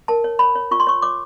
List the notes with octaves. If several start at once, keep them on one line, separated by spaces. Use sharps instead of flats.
A#4 A5
C#5
C#5 B5
C#5
F4 C#6
C6
C#5 C#6
C#5 D6